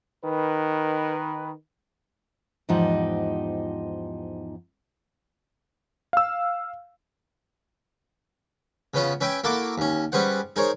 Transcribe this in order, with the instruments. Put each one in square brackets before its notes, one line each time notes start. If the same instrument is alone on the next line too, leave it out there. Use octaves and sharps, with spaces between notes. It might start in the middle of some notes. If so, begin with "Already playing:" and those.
[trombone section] D#3 B4
[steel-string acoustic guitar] E2 G#2 F3 D#4 G4 F#5
[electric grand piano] F5 E6
[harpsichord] C#3 B3 C#4 F4
C#4 B4 E5 G5 G#5
A#3 E4 F#4 A4 A5 D6
D#2 C#4
G3 C#4 G#4 B4 C5 F#5
D#4 G#4 A#4 C5 C#5